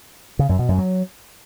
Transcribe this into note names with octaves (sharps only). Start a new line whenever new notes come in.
C#3
F#2
B2
F#2
F#3